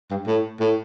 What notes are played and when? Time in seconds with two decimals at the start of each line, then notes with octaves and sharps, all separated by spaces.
0.11 G2
0.27 A2
0.60 A2